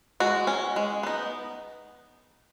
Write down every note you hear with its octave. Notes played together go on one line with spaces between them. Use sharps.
G#3 F#4
C#4
G#3
B3 D#4